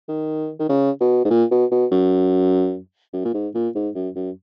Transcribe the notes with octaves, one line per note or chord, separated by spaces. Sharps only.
D#3
D#3
C#3
B2
G#2
A#2
B2
B2
F#2
F#2
A#2
G#2
A#2
G#2
F#2
F#2